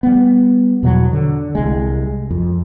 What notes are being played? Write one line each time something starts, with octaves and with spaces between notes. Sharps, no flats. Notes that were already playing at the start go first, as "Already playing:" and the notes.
G3 B3
E2 B2 F#3
D3
C2 G#3
F2